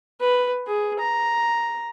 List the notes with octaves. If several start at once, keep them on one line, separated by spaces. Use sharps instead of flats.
B4
G#4
A#5